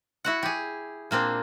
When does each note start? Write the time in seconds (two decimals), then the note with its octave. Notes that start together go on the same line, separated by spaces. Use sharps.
0.25 E4 F#4 F#5
0.43 G4 G#4
1.11 A#2 A#3 C4 D4